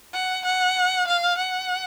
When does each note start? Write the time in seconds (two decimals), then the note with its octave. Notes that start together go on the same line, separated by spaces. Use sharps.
0.13 F#5
0.44 F#5
1.07 F5
1.37 F#5